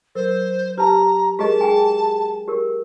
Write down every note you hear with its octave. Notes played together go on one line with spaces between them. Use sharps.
F#3 A#4 C5
G4 B4 A5 A#5
G#3 G4 G#4 A#4 D#5 A5
G#4 G5 G#5
G4 A#4